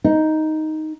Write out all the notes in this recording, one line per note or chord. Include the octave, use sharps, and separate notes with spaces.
D#4